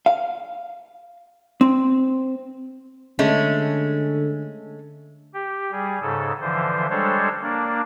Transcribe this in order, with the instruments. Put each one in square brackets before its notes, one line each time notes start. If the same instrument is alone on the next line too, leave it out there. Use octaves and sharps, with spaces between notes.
[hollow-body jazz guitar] F5
C4
[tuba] D3 [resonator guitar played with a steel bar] G#3 A3 C#4
[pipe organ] G4
G3 G#4
G#2 C#3 A4
D3 E3 F3 C5
G3 G#3 D4 A4 C5 C#5
A#3 D4